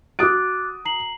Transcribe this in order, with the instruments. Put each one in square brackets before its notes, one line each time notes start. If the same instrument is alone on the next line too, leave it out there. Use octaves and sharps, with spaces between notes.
[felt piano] F#4 D#6 D7 [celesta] D6 F#6 A6
[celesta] A#5 C7 F#7